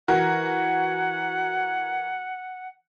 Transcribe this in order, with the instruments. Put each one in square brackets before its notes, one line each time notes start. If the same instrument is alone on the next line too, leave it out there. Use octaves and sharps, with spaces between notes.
[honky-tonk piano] E3 F#4 A#4 [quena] F#5